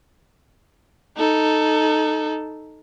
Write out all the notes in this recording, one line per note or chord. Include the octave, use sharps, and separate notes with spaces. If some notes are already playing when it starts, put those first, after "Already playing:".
D#4 A4